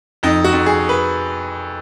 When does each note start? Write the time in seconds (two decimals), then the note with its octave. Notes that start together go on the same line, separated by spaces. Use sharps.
0.23 F2 D#4
0.44 F#4
0.52 F2
0.66 G#4
0.89 B4